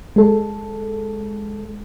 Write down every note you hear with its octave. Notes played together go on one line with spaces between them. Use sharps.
G#3 A4